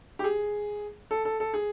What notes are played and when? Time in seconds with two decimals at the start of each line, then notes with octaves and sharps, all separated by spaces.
0.19 G4
0.24 G#4
1.11 A4
1.25 A4
1.40 A4
1.54 G#4